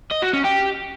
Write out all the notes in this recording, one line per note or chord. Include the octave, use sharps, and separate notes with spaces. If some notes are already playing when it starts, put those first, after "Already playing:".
D#5
F#4
C#4
G4